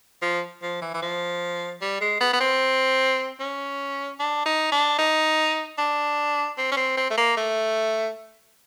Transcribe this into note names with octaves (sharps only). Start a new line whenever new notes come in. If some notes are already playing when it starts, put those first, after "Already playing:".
F3
F3
E3
E3
F3
G3
G#3
B3
B3
C4
C#4
D4
D#4
D4
D#4
D4
C4
C#4
C4
C4
A3
A#3
A3